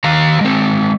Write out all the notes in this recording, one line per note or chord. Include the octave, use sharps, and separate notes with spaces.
D#3 F5 A#5
G#3 C4